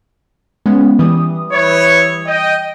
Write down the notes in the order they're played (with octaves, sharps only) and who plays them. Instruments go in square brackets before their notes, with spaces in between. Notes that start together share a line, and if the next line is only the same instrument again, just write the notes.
[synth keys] G#3 B3 C#4
E3 G3 D#6
[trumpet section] E4 B4 C#5
D#5 G5